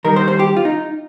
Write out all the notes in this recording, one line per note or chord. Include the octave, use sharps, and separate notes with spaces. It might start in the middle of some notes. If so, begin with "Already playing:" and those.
D#3 G3 D#4 A#4
C5
C5
G4
F4
D#4